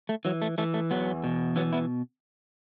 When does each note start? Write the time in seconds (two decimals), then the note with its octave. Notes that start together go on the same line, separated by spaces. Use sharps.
0.09 A3
0.25 E3 F#3
0.42 A3
0.58 E3 A3
0.74 A3
0.91 E2 F#3 B3
1.24 B2
1.56 E3 F#3 B3
1.73 B3 E4